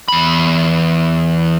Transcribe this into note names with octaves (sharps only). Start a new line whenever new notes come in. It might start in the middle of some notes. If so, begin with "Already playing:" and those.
E2 B5